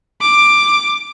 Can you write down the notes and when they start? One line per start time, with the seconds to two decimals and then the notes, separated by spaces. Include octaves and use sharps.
0.21 D6